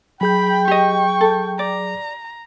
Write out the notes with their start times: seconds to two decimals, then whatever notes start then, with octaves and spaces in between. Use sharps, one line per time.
0.21 F#3 G#4 G5 B5 G6
0.68 G4 D#5 C#6
1.21 A4
1.59 D5 A#5